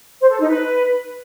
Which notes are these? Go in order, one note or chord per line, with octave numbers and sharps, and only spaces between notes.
C5
A4
D#4
B4